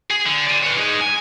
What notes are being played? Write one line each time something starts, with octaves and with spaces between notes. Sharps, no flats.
G#4
D3
D5 G#5
B4 C#5
D#4 G#4
G#5